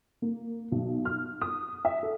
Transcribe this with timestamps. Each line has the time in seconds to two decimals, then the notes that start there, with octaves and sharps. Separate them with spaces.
0.22 A#3
0.72 B1
1.05 F6
1.41 D#6
1.85 E5
2.03 A4